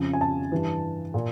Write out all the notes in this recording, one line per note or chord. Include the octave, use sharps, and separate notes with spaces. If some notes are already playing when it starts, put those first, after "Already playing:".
Already playing: F2 C#3 F3
G#5
A5
G2 E3
A#2